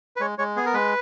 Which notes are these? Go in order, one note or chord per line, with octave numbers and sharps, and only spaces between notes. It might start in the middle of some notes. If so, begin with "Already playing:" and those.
B4
G#3 C#5
G#3 C#5
B3 G#4
A#4
G#3 B4